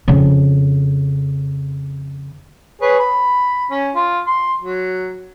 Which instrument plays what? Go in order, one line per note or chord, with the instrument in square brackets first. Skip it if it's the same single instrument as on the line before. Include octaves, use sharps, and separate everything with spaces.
[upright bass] F2 C#3
[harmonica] G#4 B4 C#5
B5
C#4
F4
C6
F#3